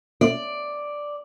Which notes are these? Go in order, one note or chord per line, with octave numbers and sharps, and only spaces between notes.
D5